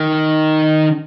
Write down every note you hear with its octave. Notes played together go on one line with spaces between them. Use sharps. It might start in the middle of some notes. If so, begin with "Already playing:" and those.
Already playing: D#3